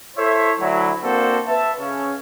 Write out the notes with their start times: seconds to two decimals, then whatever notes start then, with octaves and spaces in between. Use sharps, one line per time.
0.17 E4 A4 C5 C#5 E5
0.60 D2 F#3 E4
1.03 A#3 C4 D4 F#4 A4 C5
1.48 B4 E5 A5
1.80 C#3 C#4